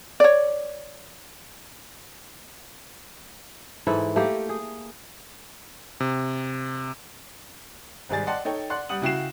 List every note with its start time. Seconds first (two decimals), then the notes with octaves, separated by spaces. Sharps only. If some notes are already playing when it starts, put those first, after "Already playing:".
0.20 C#5 D5
3.87 G#2 E3 E4 A4
4.16 A3 A#3 G4
4.49 G#4
6.00 C3
8.09 G#1 G#2 G3 G#4 D5 A6
8.27 D5 D#5 F#5 G5 A5 C6
8.45 D#4 A4 C#5 G5
8.70 D5 F#5 C6 F#6
8.89 G3 F#5 D#6 F#7
9.02 C#3 E4 F#4 G5 C7 E7